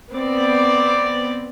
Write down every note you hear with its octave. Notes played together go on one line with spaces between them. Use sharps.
B3 C4 D5